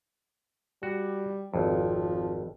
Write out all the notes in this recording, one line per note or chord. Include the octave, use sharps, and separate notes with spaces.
G3 F#4
G#1 F2 F3